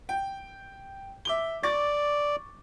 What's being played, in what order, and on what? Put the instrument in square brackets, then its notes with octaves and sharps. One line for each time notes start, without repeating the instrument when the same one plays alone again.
[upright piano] G5
E5 D6 G7
[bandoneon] D5 [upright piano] C#6 D6 A6